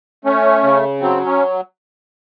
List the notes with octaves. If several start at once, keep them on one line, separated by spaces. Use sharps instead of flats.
A3 C#4
C#3
F#3 C4
C#4